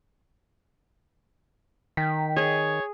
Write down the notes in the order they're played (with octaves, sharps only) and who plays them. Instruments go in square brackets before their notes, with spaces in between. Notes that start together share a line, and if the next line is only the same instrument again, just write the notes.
[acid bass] D#3 [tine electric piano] G5 B6
[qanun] G#4 [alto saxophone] C#5